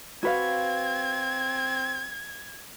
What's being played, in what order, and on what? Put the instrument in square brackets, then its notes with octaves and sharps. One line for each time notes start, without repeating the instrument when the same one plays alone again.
[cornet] C4 [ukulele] F#4 B4 F5 [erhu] G#6